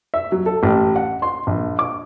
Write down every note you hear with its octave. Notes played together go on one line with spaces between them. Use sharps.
E5
F#3
A4
A1
F#5
C6
A#1
D6